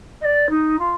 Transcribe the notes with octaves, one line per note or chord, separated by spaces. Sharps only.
D#5
D5
D#4
F4